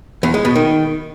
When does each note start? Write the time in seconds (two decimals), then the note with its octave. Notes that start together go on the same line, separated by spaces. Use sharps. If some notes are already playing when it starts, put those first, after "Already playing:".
0.23 E2
0.34 G#3
0.45 B2
0.56 D#3